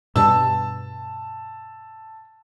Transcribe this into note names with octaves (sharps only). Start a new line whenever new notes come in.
G2 B2 G3 A5 E6